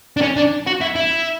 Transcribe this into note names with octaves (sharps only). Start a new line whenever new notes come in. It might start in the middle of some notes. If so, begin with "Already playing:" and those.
D4
C#4
D4
F#4
E4
E4